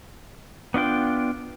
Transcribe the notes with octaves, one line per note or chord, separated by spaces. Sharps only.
B3 D4 F4 G5